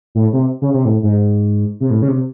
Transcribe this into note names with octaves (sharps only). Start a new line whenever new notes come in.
A2
C3
C#3
C3
A2
G#2
C3
A2
C#3
C3